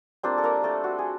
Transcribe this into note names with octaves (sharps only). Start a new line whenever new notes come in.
G3 A#3 C4 D4 F4 C5
A4
A#3 A#4
A3 A4
F#4
G#4